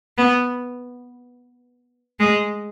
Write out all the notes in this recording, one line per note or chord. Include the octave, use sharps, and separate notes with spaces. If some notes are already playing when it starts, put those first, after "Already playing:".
B3
G#3